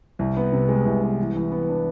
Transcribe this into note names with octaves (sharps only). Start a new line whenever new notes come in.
C2
B3
C3
G#3
C2
B3
E3
E3
B3
D4